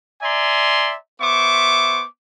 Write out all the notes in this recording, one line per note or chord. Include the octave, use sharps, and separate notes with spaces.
D5 E5 G#5 A#5 C6
B3 C5 E5 C#6 D6